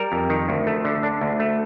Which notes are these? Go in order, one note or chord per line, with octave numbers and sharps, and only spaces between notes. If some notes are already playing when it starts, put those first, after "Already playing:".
Already playing: G3 A#4
F2
D#3
D2
A3
D3
D4
D2
A3